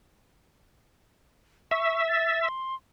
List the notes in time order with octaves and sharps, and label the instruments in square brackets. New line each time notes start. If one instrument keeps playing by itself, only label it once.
[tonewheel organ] E5 [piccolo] C#6
[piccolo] A6
C6